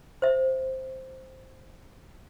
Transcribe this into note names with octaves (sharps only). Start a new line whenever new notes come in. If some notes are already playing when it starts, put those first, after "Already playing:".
C5 E5